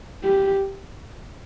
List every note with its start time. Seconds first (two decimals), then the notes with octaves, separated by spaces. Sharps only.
0.24 G4